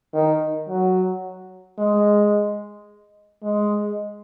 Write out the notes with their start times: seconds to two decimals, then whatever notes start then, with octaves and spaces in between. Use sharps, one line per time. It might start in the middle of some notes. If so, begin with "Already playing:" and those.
0.14 D#3
0.69 F#3
1.78 G#3
3.43 G#3